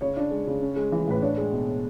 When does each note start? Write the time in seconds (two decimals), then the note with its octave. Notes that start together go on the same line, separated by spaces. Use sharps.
0.01 C#3 C#5
0.17 D4
0.31 G#3
0.47 C#3
0.62 C#4
0.76 G#3
0.92 E3
1.07 A2 B4
1.22 D4 C#5
1.37 G#3
1.52 B2